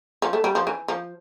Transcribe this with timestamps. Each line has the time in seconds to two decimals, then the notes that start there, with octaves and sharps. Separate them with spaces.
0.22 F3
0.33 A3
0.44 G3
0.55 F3
0.67 E3
0.88 F3